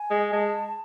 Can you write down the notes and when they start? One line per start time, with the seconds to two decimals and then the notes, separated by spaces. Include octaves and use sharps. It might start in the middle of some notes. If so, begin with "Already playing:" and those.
Already playing: G#5
0.11 G#3
0.33 G#3 A5